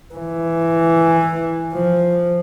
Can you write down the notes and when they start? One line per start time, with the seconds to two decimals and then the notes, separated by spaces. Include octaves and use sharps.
0.15 E3
1.74 F3